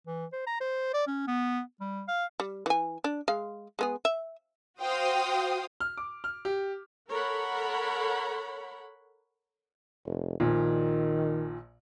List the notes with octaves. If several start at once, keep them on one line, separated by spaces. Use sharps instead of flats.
E3
C5
A#5
C5
D5
C#4
B3
G3
F5
G3
E3 G#5
D4
G#3 F5
G#3 B3 G#4
E5
F#4 C5 F5 G5 D#6
F6
D6
F6
G4
A4 A#4 C#5 F#5 B5
F1
A#1 A#2 D#3